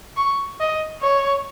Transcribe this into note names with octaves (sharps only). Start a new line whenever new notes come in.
C#6
D#5
C#5